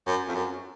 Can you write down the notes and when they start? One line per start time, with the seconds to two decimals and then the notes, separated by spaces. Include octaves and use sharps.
0.07 F#2
0.28 F2
0.35 F#2